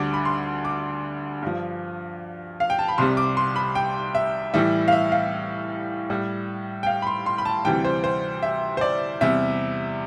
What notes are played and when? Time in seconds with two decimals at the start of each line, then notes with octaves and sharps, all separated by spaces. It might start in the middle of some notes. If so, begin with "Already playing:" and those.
Already playing: D2 D3 G3 D6
0.13 B5
0.25 C6
0.65 D6
1.42 G2 F3
2.60 F5
2.70 G5
2.79 A5
2.88 B5
2.98 C2 C3 G3 C6
3.17 D6
3.37 C6
3.56 B5
3.75 G5
4.15 E5
4.54 A2 E3 G3 E5
4.88 F5
4.92 E5
5.12 F5
6.10 A2 G3
6.83 G5
6.87 F5
7.02 B5
7.07 C6
7.26 C6
7.38 B5
7.45 A5
7.65 D2 C3 E3 G3 G5
7.85 C5
8.04 C5
8.42 E5
8.77 C5
8.81 D5
9.21 E2 C3 G3 E5